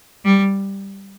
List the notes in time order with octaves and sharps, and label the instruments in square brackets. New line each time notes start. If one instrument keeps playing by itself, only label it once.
[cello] G3